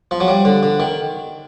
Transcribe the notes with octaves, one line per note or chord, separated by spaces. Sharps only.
F3
F#3
G3
D3
D3
D#3